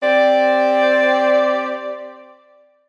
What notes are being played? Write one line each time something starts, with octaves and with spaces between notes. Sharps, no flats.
C4 G4 D5